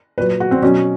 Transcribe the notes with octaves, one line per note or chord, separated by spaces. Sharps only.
A#2 F#3 B4
F#4
C4
B2 F#3 C#4